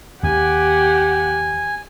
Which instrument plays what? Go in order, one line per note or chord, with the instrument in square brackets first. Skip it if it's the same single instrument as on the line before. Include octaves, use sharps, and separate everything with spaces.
[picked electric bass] D#2 [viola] G4 F#5 [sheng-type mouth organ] G#5